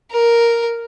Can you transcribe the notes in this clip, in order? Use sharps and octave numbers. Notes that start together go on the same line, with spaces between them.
A#4